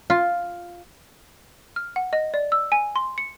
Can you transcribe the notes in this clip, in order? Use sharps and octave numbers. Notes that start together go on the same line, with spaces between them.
F4
F6
F#5
D#5
D5
E6
G#5
C6
C#7